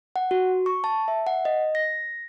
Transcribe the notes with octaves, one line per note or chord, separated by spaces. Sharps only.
F#5
F#4
C#6
A5
E5
F#5
D#5
A#6